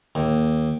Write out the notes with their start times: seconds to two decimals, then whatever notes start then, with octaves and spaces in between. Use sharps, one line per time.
0.15 D#2